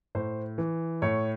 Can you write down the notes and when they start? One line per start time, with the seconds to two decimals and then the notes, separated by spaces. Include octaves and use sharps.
0.15 A2 C5
0.58 E3
1.02 A2 C#5